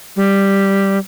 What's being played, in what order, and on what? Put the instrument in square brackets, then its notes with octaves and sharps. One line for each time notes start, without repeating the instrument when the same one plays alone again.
[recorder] G3